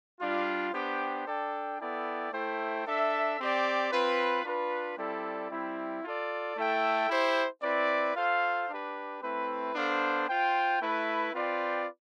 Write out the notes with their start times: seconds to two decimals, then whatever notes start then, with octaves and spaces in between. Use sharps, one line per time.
0.20 G3 D4 F4
0.73 B3 D4 G4 C5 G5
1.25 D4 A4 D5 G5
1.79 B3 E4 A4 D5 G5
2.31 A3 E4 A4 C5 G5
2.85 D4 A4 E5
3.38 C4 G4 D5
3.91 C4 F4 B4
4.43 D4 F4 B4
4.97 G3 C4 E4 A4 D5
5.50 G3 C4 E4
6.03 F4 A4 D5
6.56 A3 E4 A4 E5 G5
7.09 E4 G4 C5
7.62 C4 E4 B4 D5
8.14 F4 A4 C5 F5
8.68 D4 G4 B4
9.22 A3 C4 E4 B4
9.74 B3 D4 A4 C5 F5
10.27 F4 C5 G5
10.80 A3 E4 B4
11.33 C4 F4 B4 D5 G5